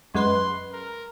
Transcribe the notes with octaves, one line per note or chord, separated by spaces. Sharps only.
F#2 G#3 B4 C6
A#4